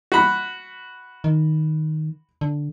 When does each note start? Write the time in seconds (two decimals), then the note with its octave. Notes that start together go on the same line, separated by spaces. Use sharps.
0.12 F#4 B5
1.24 D#3
2.41 D3